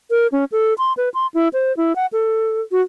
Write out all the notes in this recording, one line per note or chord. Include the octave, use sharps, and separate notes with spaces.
A#4
C#4
A4
C6
B4
C6
E4
C5
E4
F#5
A4
F#4